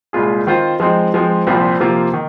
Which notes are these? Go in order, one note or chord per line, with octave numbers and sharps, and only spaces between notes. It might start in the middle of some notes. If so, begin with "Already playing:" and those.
C2 A#2 G#3 F4 G#4
D#3 C4 F4 C5
F3 G#3 C4 D#4
F3 G#3 C4
C2 A#2 F3 C4
C3 F3 A#3 F4
D#3